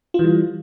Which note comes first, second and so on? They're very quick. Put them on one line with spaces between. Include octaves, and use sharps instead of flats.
F4 E3 G3